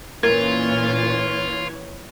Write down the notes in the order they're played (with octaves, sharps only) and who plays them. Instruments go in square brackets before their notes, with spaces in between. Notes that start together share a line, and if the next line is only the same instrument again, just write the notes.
[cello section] A#2 C#4 [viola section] E3 C#5 [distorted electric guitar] F4 [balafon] A#4